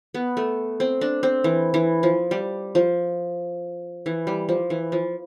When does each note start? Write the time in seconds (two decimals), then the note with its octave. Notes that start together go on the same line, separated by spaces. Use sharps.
0.14 B3
0.37 A3
0.80 C4
1.01 D4
1.23 C4
1.44 E3
1.74 E3
2.03 F3
2.31 G3
2.75 F3
4.06 E3
4.27 G3
4.49 F3
4.70 E3
4.92 F3